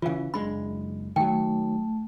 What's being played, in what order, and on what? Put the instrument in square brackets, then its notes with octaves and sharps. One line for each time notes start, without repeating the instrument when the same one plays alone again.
[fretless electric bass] C#3 E3 [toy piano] F4 F5
[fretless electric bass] F#1 G#3 D4 [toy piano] B5
[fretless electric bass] D#3 F#3 [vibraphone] A3 [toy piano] G5